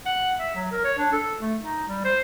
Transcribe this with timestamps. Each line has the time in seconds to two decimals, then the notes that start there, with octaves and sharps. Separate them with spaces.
0.06 F#5
0.39 E5
0.55 F#3
0.72 A#4
0.84 C#5
0.98 D4
1.13 A4
1.40 A3
1.62 D#4
1.88 G3
2.05 C5